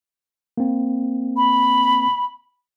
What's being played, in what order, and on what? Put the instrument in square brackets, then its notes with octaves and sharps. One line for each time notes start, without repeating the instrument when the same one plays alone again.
[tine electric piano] A#3 C4
[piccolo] B5